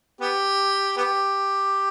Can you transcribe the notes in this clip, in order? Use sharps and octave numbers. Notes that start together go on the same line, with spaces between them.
B3 G4
B3 G4